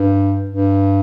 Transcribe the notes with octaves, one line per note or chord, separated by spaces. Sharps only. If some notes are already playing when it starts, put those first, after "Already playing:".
Already playing: G2
G2